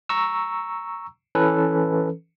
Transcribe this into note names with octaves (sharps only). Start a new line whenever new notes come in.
A#5 C#6 E6
E3 C#4 A4 B4